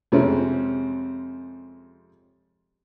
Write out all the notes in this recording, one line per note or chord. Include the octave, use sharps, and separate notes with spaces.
F2 C3 G#3 C4 C#4